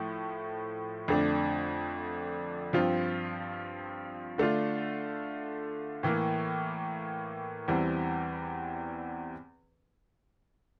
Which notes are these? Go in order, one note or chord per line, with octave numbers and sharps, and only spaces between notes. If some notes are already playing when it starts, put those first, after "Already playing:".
Already playing: A2 F3 A3
F2 D3 A3 D4
G2 F3 C4 F4
D3 A3 D4 F4
A2 E3 A#3
E2 E3 G3 C4